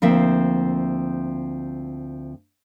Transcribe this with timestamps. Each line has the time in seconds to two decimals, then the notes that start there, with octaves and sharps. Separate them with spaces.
0.02 D2 F3 A#3 C4 E5